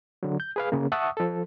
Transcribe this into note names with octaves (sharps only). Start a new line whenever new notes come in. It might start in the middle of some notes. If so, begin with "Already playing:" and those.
D3 F#3
G6
G#4 B4 F5
C#3 A#3
E5 F#5 A5 C#6 D#6 E6
F3 A4